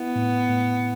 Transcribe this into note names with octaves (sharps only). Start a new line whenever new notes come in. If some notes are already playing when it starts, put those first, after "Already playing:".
Already playing: B3 E4
A2
A2